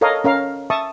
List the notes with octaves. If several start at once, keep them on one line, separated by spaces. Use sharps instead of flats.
A4 A#4 C#5 D#5 F5
C#4 A#4 F5
E5 A5 C#6 D#6